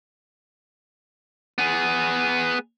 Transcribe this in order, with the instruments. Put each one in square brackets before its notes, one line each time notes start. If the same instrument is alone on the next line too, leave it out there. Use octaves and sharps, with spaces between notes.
[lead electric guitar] B3 G#4